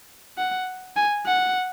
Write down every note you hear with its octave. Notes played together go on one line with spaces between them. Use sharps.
F#5
G#5
F#5